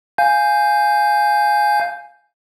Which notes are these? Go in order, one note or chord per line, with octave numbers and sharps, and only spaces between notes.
F5 G#5 G6